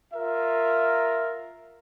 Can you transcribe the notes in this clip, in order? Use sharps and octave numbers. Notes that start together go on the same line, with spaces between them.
F4 A#4 E5